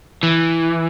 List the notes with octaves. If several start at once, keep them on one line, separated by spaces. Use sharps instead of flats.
E3